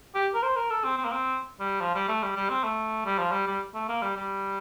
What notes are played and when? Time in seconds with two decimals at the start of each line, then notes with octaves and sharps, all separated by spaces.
0.15 G4
0.34 A#4
0.43 C5
0.56 A#4
0.70 A4
0.84 C4
0.98 C4
1.05 A#3
1.12 C4
1.60 G3
1.81 F3
1.95 G3
2.08 A3
2.23 G3
2.36 G3
2.50 C4
2.63 A3
3.06 G3
3.18 F3
3.31 G3
3.47 G3
3.74 A3
3.89 A#3
4.02 G3
4.16 G3